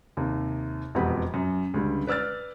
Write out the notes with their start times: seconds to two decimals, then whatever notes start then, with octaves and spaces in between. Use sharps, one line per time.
0.17 D#2 C3
0.95 E1 F2 B3 G4 F#5 B5
1.34 F#2
1.74 C#2 D3 G3
2.07 B4 D5 E6 F6 A6